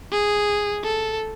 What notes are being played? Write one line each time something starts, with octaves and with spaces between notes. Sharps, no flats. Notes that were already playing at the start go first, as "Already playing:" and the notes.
G#4
A4